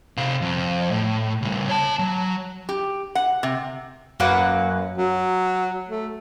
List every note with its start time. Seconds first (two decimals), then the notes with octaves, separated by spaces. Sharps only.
0.17 C3 F5
0.42 F2
0.91 A2
1.42 C#3 G3
1.68 C#5 A5
1.99 F#3
2.69 G4
3.15 F#5
3.43 C3
4.20 F#2 A#3 B4 F#5
4.98 F#3
5.88 A3